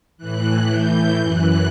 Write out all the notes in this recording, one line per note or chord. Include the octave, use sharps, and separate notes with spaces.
A2 E3 F#6
G6
F#2 E3 F#6